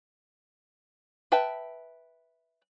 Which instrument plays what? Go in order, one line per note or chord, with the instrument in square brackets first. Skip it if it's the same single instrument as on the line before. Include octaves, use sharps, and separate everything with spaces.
[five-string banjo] B4 E5 G5 A5